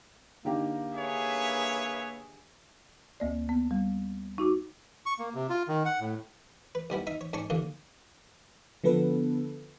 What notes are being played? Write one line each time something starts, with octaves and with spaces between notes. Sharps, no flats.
D3 A#3 D#4 G4
G#4 B4 C#5 E5
D2 A#3 D5
B3
G3
D#4 F#4 D6
C#6
A#3
C3
F4
D#3
F#5
A2
B4
B1 G3 B3 E4
D#4 E5
C#5
G#2 D4 C#5 C#6
D#2 A#2 D3 A#3
D3 F3 B3 A4 B4